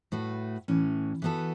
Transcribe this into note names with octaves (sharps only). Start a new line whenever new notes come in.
A2 A3 F#4 B4
A2 E3 C#4
E3 B3 F#4 A4